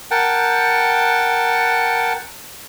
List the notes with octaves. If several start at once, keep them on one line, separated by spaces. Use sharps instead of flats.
A#4 F#5 G5 A5